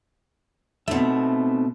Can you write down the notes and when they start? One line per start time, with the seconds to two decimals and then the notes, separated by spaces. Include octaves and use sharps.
0.88 B2 A3 C4 D#4 E5